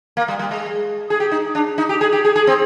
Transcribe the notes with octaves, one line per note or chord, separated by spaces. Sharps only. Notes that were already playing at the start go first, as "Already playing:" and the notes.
A#3
G3
G3
G#3
G#4
G4
D#4
D4
D#4
G4
G#4
G4
G#4
G#4
C4